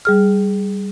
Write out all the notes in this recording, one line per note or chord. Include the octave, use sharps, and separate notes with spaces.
G3 G#4 F6